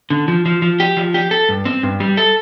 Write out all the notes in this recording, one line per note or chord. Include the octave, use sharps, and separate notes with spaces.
D3
F3
F3
F3
G4
F3
G4
A4
G2
C4
G2
G3
A4